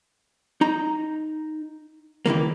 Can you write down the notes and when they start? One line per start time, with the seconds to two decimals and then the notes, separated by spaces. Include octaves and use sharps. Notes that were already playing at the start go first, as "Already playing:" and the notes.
0.61 D#4 A#5
2.26 C#2 D#3 E3 A#3